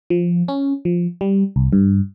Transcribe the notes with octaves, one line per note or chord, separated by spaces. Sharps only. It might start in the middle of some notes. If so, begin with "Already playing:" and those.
F3
C#4
F3
G3
C2
G2